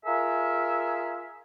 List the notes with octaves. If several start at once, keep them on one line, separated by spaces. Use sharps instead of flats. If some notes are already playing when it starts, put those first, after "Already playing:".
F4 G#4 A#4 E5